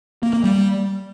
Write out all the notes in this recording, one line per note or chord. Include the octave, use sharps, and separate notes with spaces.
A#3
A#3
G3